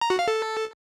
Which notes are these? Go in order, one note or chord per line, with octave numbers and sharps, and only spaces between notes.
A#5
F#4
F5
A4